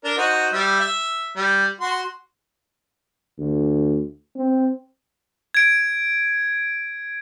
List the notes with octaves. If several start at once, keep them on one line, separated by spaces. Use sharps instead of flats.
D4 A#4
D#4 F#4 C5
G3 E5
E5
G3
F#4 C6
D2
C4
G#6 D7